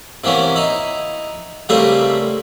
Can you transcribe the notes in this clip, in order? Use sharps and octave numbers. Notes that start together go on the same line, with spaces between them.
C3 E3 A#3 B3 C#4
D#4 E4
C#3 G3 A3 A#3 C4 E4